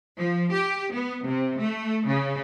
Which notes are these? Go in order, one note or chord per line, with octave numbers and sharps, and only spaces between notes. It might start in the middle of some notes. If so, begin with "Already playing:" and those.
F3
G4
B3
C3
A3
C#3